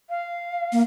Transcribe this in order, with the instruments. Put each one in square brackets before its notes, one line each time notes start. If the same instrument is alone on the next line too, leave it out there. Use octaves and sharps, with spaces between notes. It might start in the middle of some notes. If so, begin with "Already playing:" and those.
[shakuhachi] F5
[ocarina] A#3